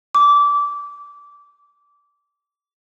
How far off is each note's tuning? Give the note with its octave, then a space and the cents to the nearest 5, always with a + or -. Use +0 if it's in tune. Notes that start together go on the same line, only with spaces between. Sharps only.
D6 -20